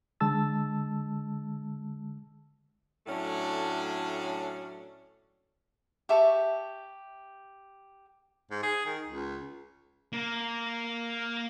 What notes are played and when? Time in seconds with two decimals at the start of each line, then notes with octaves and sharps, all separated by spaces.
0.20 D3 G#3 A5 E6 A6
3.06 A2 F#3 A3 C#4 D4
6.09 G4 E5 A5 C#6
8.51 G#2
8.63 G#4
8.86 D#3
9.07 C#2
10.13 A#3